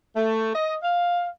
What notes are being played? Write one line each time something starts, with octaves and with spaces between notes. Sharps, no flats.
A3
D#5
F5